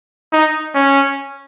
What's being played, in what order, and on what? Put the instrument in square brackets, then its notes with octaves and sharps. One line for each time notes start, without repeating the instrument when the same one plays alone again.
[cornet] D#4
C#4